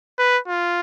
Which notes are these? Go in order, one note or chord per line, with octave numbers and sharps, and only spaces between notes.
B4
F4